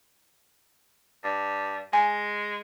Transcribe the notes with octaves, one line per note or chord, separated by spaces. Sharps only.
G2
G#3 G#5